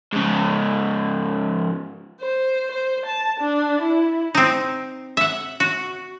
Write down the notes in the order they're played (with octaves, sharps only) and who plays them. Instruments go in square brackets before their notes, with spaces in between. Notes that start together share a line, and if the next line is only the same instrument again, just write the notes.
[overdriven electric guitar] G#2 C#3
[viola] C5
C5
A5
D4
E4
[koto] C4 D#4
E5 F#5
F#4